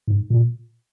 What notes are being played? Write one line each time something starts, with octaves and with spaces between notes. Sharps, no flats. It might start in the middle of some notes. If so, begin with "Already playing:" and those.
G#2
A#2